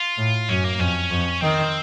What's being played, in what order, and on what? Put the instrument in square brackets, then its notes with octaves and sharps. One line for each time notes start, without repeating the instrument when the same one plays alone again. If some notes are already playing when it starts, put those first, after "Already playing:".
Already playing: [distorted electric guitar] F4
[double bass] A2
[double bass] F#2 [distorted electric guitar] C#4
[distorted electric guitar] A#3
[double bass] F2 [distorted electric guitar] C#4
[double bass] F2
[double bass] D#3 [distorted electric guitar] C4